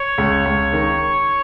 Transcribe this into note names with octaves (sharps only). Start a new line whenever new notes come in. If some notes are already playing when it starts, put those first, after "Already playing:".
Already playing: C#5
C#2
C#2
D#3